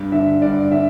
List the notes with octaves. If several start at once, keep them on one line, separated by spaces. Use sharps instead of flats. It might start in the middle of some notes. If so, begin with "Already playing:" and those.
Already playing: G2
D3 E5
G2 D5
D3 E5